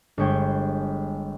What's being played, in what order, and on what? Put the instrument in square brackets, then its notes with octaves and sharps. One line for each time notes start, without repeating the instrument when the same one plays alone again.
[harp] G1 G3 G#3 C#5 G5 G#6